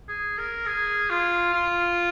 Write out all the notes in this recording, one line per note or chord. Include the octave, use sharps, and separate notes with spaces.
G#4
A#4
G#4
F4
F4